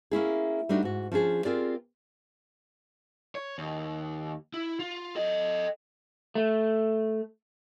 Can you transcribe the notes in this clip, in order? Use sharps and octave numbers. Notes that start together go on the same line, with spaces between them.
A#3 C#4 E4 G#4
G3 A3 D4 D#4 F#4
G#2 F#4
F3 C#4 D4 G#4
C4 F4 G4 G#4 A#4 D5
C#5
D#2
E4
F4
A4 D#5
A3